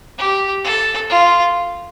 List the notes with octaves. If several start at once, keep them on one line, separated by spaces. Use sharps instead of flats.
G4
A4
F4